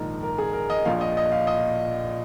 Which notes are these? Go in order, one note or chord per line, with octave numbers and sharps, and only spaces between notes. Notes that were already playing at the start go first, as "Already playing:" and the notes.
Already playing: A#1 G#2 D#3 A#4
A#4
G#4
A#4
D#5
A#1 A#2 F3 F5
D#5
D#5
F5
D#5